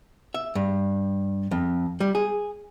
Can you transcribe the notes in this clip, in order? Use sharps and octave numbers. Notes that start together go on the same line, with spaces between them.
E5
G2
F2
G3
G#4